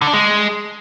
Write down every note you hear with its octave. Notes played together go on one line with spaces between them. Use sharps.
D3
D4
G#3